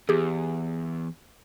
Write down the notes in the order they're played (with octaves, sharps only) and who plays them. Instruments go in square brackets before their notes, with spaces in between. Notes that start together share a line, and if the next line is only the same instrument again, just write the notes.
[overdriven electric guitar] E2 [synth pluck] G4 G#4